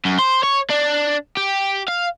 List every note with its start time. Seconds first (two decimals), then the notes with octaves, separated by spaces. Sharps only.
0.05 F#2
0.19 C5
0.44 C#5
0.70 D4
1.37 G4
1.88 F5